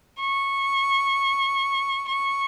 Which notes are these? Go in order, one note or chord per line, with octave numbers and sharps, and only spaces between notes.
C#6
C#6